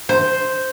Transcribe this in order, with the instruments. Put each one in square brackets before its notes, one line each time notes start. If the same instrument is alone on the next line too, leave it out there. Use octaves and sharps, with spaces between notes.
[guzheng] C5